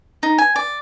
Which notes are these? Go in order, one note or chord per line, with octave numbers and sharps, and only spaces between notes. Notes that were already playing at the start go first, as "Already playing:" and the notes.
D#4
G#5
D5